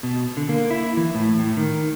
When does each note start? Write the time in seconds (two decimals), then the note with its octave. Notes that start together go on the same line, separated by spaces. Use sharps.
0.03 B2
0.37 D3
0.49 A#3
0.70 E4
0.97 E3
1.15 A2
1.39 A2
1.57 D#3